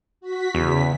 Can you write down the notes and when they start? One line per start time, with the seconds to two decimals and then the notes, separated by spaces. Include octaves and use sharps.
0.21 F#4 B6
0.55 E2 C#3 B6